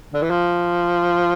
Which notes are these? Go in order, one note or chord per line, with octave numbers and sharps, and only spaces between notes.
D3
E3
F3